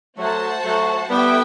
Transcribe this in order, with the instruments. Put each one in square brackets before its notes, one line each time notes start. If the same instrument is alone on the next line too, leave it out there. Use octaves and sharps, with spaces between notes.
[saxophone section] F#3 A3 [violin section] F#4 C5 F#5 A5
[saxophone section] F#3 A3
[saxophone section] G3 B3 [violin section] E4 A4 E5 G5